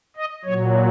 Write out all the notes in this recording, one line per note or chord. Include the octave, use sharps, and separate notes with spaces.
D#5
F#3 C#5
A#2